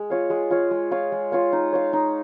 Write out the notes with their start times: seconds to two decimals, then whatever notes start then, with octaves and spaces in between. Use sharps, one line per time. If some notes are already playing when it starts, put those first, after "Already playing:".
Already playing: G#3
0.10 F4 C#5 F5
0.30 G#3
0.51 F4 C#5 F5
0.71 G#3
0.91 F4 C#5 F5
1.12 G#3
1.32 F4 C#5 F5
1.53 D#4
1.73 C#5 F5
1.93 D#4